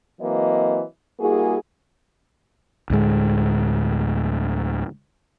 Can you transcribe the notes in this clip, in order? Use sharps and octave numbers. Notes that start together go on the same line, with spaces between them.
E3 F#3 A#3 C4 D#5
G3 A#3 E4 F#4 G#4
D2 A2 G#3